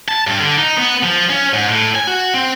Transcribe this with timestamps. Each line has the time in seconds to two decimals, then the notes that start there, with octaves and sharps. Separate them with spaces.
0.08 A5
0.27 G2
0.41 D3
0.58 D#4
0.78 B3
1.04 F3
1.30 C#4
1.53 G#2
1.68 A2
1.95 G#5
2.07 F#4
2.34 C4